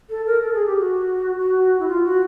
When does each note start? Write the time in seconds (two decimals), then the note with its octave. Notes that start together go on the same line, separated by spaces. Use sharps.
0.10 A4
0.26 A#4
0.42 A4
0.54 G#4
0.66 G4
0.78 F#4
1.39 F#4
1.80 E4
1.88 F4
2.04 F#4